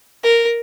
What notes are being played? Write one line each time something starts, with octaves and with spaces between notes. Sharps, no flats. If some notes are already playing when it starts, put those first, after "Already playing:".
A#4